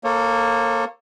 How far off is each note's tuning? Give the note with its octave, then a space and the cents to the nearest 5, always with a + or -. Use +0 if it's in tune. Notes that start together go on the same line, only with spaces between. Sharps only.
A#3 +0 A4 +15 C#5 -35